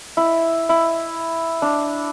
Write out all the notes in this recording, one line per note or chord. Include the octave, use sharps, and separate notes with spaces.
E4
E4
D4